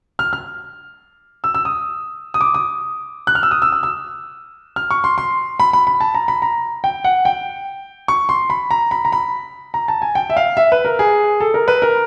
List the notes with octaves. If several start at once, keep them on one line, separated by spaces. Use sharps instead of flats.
F6
F6
E6
E6
D#6
D#6
D6
D#6
F#6
F6
E6
D#6
E6
E6
E6
F6
C#6
C6
C6
B5
B5
B5
A5
A#5
B5
A#5
G5
F#5
G5
C#6
C6
B5
A#5
B5
A#5
B5
A#5
A5
G#5
G5
E5
F5
E5
B4
A#4
G#4
A4
A#4
B4
A#4